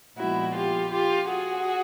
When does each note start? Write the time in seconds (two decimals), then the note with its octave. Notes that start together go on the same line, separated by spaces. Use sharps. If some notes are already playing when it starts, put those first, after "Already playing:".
0.17 A#2 F3 G#3 B3 E4 F#4
0.54 F4 G4
0.91 F4 G4
1.29 F#4 G#4